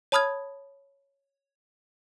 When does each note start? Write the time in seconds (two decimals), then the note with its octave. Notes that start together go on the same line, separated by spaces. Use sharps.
0.12 C#5 A5 B5 D#6 F6 G#6